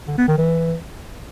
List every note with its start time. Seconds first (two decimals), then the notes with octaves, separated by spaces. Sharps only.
0.07 D3
0.18 B3
0.28 D#3
0.38 E3